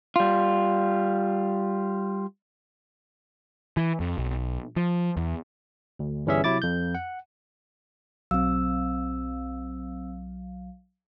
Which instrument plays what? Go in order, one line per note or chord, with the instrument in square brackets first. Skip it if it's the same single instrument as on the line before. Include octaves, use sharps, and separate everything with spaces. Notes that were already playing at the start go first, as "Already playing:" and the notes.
[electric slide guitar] G3 F4
[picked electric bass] E3
F2
B1
F3
E2
[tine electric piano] D2
G1 E3 G3 C#4 G#4 E5
C3 F#3 E4 D6 A6
F2 G6
F#5
[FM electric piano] B1 F#3 F5 [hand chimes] C4 E6